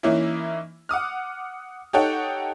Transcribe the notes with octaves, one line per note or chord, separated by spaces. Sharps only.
E3 A#3 C#4 D#4 E4
F#5 D6 D#6 F6
D#4 G4 A4 C#5 F#5 G5